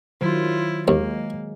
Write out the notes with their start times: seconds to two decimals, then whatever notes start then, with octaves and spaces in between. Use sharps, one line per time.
0.21 D#3 F#3 E4 F4 C5
0.88 D#2 G#3 A#3